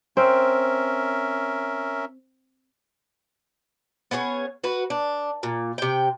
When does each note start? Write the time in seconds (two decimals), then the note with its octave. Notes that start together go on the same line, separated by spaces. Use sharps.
0.17 C4 C#4 A#4 E5
4.11 B3 C#4 G#4 C#5
4.64 F#4 B4
4.90 D4
5.43 A#2
5.78 C3 G5